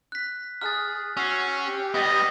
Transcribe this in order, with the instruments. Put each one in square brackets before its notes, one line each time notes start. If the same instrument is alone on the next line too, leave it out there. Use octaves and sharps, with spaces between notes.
[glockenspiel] F#6 B6
[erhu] G#4 [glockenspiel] F6 F#6 A6
[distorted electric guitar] C#4 [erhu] F#4 [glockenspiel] E6 C7
[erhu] G4
[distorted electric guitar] G3 B3 [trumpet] D#5